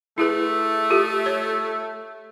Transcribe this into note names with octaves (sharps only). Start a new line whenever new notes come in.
A3 E4 G#4 B4
F4 G4 A4
C#5